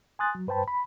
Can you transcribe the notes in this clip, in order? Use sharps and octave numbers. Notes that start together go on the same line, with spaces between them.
G#5 C6 D#6 F#6 A6
F#3
G2 B4 C5 G5 A5 B5
B5